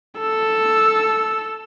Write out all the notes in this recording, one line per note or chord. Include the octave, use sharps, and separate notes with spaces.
A4 E6